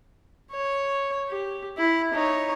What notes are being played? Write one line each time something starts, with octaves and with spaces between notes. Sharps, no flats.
C#5
G4
E4
D#4 C#5